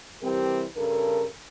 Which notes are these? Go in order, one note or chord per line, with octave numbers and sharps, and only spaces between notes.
C3 E3 G3 C4 G4 A#4
G2 C#3 A4 A#4